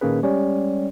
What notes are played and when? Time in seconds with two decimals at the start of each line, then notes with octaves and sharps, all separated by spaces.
0.01 A#2 D#3 A#3 C#4 G#4 B4
0.23 G3 G#3 C#4 G4 C#5 D5